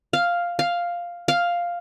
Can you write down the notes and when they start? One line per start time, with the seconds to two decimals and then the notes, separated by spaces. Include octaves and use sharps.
0.13 F5
0.59 F5
1.28 F5